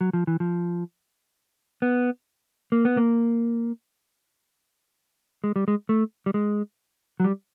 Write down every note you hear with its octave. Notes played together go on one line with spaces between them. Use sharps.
F#3
F3
E3
F3
B3
A#3
B3
A#3
G#3
G3
G#3
A3
G3
G#3
F#3
G3